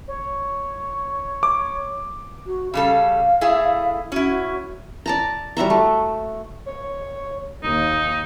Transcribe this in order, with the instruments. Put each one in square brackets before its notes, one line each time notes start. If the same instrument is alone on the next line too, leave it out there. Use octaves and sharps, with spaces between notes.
[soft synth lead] C#5
[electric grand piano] D6
[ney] F#4
[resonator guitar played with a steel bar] C#3 G3 A4 [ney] F5
[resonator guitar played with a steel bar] A3 E4 G#4
[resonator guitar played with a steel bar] C#4 E4 [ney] F#4
[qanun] D5 A5 A#5
G3 F#4 E5 A#5
A3
[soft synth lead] C#5
[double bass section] D#2 [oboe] D#4